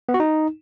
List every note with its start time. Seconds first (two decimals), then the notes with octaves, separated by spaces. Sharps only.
0.09 B3
0.14 F#4
0.20 D#4